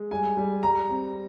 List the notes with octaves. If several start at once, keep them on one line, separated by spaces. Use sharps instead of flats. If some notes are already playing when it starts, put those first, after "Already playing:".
Already playing: G#3
G3 G#5
G3
G3 A#5
C4